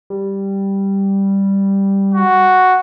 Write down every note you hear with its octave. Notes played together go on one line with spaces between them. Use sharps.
G3
F#4